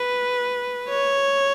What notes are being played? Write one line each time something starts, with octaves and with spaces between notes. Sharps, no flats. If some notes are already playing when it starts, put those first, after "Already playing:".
Already playing: B4
C#5